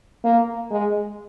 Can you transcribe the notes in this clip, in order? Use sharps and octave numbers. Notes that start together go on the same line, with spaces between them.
A#3
G#3